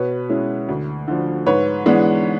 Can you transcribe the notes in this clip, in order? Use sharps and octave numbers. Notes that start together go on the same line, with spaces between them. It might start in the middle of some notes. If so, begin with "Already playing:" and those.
Already playing: B2 B4 C#5
G#3 C#4 E4
D2
D3 F3
G#2 B4 C#5
E3 G#3 B3 D4